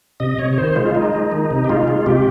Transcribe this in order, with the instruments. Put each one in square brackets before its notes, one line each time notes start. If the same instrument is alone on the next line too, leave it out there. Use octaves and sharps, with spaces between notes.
[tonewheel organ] C3 D#5
C3 C#5
C#5
D#3 C5
G#3 F4
G#3 D#4
G#3
D#3
C3
G4
G#3 F4
G#3
C3 G4